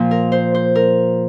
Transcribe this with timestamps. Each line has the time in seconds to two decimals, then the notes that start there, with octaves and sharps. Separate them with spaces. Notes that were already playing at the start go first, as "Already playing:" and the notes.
Already playing: A#2 F3
0.11 A#4
0.32 C5
0.55 C5
0.75 A#4